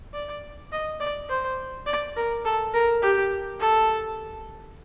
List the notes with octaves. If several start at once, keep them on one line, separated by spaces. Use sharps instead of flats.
D5
D#5
D5
C5
D5
A#4
A4
A#4
G4
A4